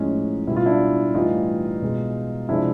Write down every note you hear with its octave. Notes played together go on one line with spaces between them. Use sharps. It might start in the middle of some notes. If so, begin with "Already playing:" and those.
Already playing: A2 F3 G#3 C#4 D#4
B2 G3 E4
F4
D4 E4
A2 E3 G3 D#4 F4
B2 G#3
C3 F3 G#3 D4 E4